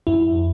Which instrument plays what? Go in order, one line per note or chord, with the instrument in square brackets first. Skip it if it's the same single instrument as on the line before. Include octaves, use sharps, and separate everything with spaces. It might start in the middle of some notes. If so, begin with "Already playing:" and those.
[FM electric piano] F2 E4